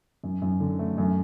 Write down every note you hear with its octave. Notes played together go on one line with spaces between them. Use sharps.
F#2
F#2
D3
A3
F#2